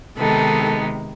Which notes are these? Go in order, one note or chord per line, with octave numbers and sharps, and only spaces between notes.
C3 D#3 G#3 B3 D#4 A4